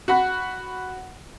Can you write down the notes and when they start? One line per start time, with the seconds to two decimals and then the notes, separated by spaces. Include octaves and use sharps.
0.08 F#4 F#5 B5